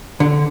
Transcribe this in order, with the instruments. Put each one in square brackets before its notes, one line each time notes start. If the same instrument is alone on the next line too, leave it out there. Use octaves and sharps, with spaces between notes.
[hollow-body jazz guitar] D3